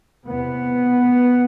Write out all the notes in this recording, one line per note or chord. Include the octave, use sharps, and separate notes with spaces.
E2 C3 B3